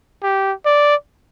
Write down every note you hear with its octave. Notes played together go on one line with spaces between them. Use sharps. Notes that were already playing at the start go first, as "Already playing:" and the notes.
G4
D5